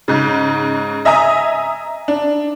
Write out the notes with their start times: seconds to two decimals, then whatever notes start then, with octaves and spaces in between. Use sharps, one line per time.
0.08 G#2 C#3
1.05 D#5 E5 G#5 A#5 D#6
2.08 D4